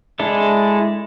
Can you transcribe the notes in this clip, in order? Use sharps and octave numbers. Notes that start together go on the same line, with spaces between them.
G#3 D4 E4 A4